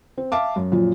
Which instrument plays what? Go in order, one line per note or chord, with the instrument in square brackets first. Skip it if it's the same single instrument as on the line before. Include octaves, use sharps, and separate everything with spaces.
[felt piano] C4
E5 F5 A5 D6
F#2
F#2 A#2 F3